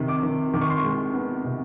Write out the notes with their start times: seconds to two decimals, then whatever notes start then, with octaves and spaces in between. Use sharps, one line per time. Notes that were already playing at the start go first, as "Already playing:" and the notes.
Already playing: C3 D#3
0.08 D6
0.23 D#3
0.54 D#3 D6
0.62 C#6
0.70 C6
0.77 C#6
0.84 G#3
1.14 B3
1.44 C3